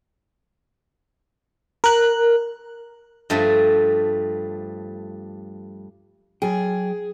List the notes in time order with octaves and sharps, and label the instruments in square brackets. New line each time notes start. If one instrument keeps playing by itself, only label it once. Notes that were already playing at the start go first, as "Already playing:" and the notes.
[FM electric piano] A#4 F#6
[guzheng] G2 F3 A3
[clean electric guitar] F#3 G5 [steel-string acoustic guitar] G#4